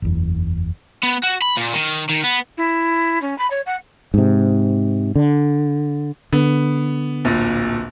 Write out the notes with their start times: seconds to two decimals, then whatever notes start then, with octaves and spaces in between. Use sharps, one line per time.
0.02 F#1 E2
1.03 B3
1.23 F#4
1.42 B5
1.57 A#2
1.74 D#3
2.10 D#3
2.24 B3
2.58 E4
3.22 C#4
3.38 B5
3.50 C#5
3.66 F#5
4.14 G#2 C3
5.16 D3
6.33 D3 B3
7.25 D1 A#1 A#2